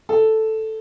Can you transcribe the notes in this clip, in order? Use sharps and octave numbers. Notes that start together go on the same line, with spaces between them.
A4